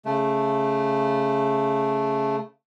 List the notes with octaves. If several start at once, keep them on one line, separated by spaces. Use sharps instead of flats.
C#3 A3